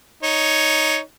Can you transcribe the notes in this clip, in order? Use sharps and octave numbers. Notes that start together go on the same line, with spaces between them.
D#4 C#5